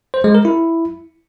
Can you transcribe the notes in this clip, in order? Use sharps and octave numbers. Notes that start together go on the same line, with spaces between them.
C5
G#3
A#4
E4